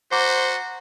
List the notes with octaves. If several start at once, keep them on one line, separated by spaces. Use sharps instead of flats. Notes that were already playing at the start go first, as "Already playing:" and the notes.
F#4 C5 F#5 A#5 D6